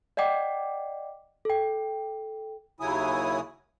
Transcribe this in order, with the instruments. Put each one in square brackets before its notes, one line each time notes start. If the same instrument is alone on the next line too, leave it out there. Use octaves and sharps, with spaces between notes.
[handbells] D5 D#5 F#5 G5 D6
A4 G5
[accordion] D#2 C#3 F#3 E4 G#5 D#6